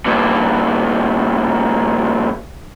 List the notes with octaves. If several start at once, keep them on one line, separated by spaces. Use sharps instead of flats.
G2 A#2